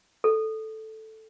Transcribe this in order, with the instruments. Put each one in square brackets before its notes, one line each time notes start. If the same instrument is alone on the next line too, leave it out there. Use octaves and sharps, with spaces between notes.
[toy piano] A4